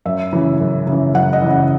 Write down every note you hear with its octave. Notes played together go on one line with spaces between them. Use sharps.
F#2 E5
C#3 E3
F#2
C#3
E3
F#2 F#5
D#5
C#3 E3